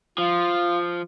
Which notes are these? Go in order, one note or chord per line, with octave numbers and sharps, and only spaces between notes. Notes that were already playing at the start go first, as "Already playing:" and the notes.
F3 F4